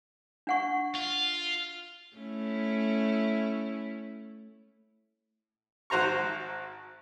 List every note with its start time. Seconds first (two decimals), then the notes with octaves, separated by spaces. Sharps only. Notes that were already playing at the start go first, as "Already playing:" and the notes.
0.47 D4 F#5 C#6
0.95 F4
2.16 A3 C#4 E4
5.90 G#1 F#4 C5 A#5 C#6